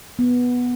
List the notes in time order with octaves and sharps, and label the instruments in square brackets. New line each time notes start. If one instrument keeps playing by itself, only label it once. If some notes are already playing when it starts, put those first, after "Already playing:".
[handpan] B3